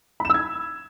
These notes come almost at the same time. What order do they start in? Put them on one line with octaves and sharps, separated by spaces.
B5 E7 E6 G#6